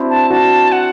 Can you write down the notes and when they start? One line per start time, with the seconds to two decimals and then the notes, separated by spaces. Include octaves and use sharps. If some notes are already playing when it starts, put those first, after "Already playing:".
Already playing: C4 D4 E4 F#4
0.10 A5
0.30 D4 F#4 A5
0.72 F#5